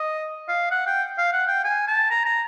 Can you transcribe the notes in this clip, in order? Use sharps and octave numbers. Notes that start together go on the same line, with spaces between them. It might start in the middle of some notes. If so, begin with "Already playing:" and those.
Already playing: D#5
F5
F#5
G5
F5
F#5
G5
G#5
A5
A#5
A#5